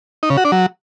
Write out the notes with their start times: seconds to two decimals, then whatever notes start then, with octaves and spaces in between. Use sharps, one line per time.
0.23 D#4
0.30 C#3
0.37 F#4
0.45 D4
0.52 F#3